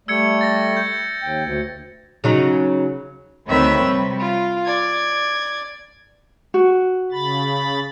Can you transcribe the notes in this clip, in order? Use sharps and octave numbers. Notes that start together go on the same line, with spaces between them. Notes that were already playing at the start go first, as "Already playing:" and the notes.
G3 A3 E6 G#6 C#7
A6 A#6
G6
D#2 G5
D2
C#3 F#3 D#4
D2 D#3 C4 B4 C#5 E5
C3 G3
F4
D5 G#6
F#4
C#3 B5 A6